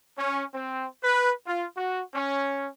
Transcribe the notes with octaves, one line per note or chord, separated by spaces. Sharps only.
C#4
C4
B4
F4
F#4
C#4